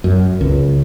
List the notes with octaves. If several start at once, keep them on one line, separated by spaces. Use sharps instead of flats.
F#2
C#2